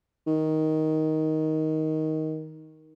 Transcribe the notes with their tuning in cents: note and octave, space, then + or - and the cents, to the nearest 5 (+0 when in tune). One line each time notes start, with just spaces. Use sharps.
D#3 +10